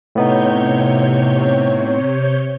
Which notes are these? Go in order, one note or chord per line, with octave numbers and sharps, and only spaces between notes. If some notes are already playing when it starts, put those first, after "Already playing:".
A2 C3 B3 D#4 C#5 G6